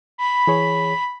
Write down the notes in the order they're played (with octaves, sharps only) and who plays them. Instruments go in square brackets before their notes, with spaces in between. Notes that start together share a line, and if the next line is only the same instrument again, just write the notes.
[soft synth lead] B5
[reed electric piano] E3 G#4 C#5